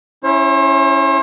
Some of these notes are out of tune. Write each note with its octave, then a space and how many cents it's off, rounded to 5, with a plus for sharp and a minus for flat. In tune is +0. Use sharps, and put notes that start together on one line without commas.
C#4 +0 E4 +0 C5 +45